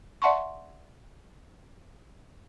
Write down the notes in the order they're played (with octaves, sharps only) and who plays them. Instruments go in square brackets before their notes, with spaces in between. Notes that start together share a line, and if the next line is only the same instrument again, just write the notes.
[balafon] D5 E5 F#5 A5 C6 C#6